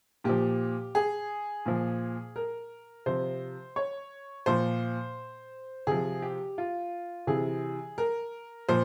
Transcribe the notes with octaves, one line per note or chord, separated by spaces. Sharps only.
A#2 F3 G4
G#4
A#2 F3
A#4
C3 F3 C5
C#5
A#2 F3 C5
C3 F3 G#4
G4
F4
C3 E3 G#4
A#4
A#2 F3 C5